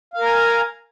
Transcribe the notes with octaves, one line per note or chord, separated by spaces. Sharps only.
A#4 F5 G#5 A#5